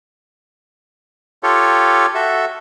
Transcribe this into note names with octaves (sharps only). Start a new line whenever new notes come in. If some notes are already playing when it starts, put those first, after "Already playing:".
F4 G4 A4 C#5
F#4 A4 E5